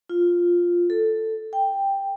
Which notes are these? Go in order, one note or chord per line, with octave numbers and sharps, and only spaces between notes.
F4
A4
G5